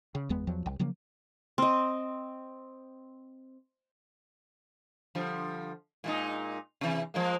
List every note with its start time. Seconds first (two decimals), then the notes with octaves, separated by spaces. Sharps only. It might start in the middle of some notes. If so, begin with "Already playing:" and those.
0.15 C#3
0.29 F#1 E2 G#3 B3
0.47 E2 F3 F#3
0.66 C2
0.79 C#3 F3 F#3 A#3
1.58 C4 D#5
5.15 D3 F3 G3
6.04 A#2 G#3 D#4
6.81 C3 E3
7.14 F3 G#3 A#3